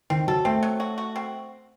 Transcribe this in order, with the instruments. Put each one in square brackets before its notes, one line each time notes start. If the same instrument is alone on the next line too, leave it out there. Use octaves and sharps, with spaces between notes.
[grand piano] D#3 [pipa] C4
[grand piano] F#3 [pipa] A4
[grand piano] A3 [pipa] C4
[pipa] F#3
F#4
F#4
C4